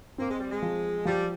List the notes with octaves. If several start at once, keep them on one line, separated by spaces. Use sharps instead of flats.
A#3 C4
G#3
G3
G#3
F3
F3 G3